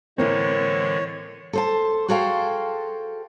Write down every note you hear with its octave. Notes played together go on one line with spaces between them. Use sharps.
A2 D3 E3 G#3 A#3 C4 C#5
A4 C5 A5
F#4 G#4 A4 C5 F5 G5